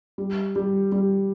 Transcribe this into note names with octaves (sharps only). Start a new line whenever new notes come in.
G3
G3
G3